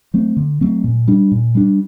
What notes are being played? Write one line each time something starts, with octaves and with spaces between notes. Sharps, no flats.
F#3 A3 C4
D3
F#3 A3 C4
A#2
G3 D4
A#2
G3 D4